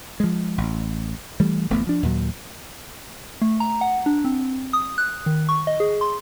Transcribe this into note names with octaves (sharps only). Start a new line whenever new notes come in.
F3 G#3
A1
E3 G3 A3
D1 A1 A3 B3
F3 D4
D#2 A#2 F#3
A3
A#5
F#5
D4
C4
D#6
F#6
D#3
C#6
D#5
G#4
C6